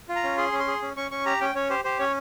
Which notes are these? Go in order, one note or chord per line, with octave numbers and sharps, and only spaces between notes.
F4
A#5
C#4
G#4 C6
C#4
C6
G#4
C#4
C#4 C#6
C#4 C#6
G4 A#5
C#4 G5
C#4 C#5
G4 C5
G4 C5
C#4 C#5